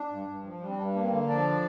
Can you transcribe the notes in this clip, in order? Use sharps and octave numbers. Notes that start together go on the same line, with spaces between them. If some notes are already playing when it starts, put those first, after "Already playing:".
Already playing: D4
G2
G2
F3
G3 D4
C4
G2 D4
A#3 D4
C4
D3
F3 D4 D5